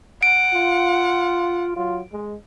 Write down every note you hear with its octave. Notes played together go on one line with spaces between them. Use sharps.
F#5 D7
F4
F#3 F4
G#3